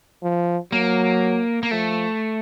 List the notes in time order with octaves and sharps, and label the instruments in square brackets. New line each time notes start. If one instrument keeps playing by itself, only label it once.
[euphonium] F3
[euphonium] F#3 [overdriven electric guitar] A#3
[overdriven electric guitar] A#3
[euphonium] F3 [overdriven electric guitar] A3